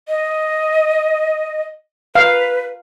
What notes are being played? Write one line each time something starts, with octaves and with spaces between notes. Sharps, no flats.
D#5
B4 F5